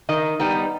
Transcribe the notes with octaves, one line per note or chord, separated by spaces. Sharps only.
D#3 D#5
G3 B3 D#4